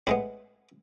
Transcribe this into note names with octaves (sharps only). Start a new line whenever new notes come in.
A2 G#3 B3 E4